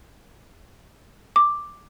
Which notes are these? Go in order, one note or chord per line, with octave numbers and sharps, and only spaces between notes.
D6